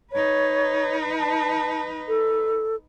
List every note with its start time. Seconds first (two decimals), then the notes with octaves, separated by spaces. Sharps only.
0.12 D#4 B4 C#5
1.18 A5
2.08 A4